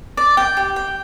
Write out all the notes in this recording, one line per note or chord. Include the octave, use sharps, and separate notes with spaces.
D5
G5
G4
G5